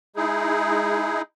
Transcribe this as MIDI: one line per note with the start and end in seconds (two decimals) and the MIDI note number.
0.16 1.22 56
0.16 1.22 63
0.16 1.22 64
0.16 1.22 68